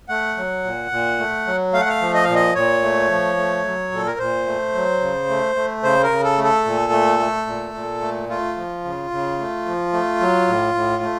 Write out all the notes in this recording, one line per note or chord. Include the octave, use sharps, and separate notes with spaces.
A3 F#5
F#3
A#2
A#2
A3
F#3
A3 F5
F#5
F5
F3
D#5
A#2 F5
D#5
A#2 C#5
A3
F3
A3
F#3
A#2 A4
A#4
A#2 C5
A3
F#3
C#3
A3
A3
C#3 C5
A#4
C#3
A4
A3
A4
A#2
A3
A3
A#2
A#2
A3
A3 F4
F3
C#3
C#3
A3
F3
A3
F#3
A2
A2
A3